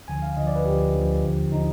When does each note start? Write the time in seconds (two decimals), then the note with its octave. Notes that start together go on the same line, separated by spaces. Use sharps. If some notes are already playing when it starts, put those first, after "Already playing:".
0.08 D2 D3 F3 G#5
0.22 F5
0.37 D2 D3 F3 D#5
0.47 D5
0.55 B4
0.66 D2 D3 F3 G4
0.95 D2 D3 F3
1.23 D#2 D3 F3
1.52 D3 F3 D#4